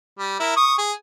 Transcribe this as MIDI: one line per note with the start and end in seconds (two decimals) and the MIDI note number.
0.18 0.39 55
0.40 0.53 64
0.40 0.53 70
0.56 0.74 85
0.56 0.74 87
0.78 0.93 68